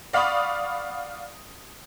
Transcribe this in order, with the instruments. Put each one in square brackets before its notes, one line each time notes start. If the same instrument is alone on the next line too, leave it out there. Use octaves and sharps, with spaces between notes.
[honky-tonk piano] D5 F5 F#5 B5 C#6 D#6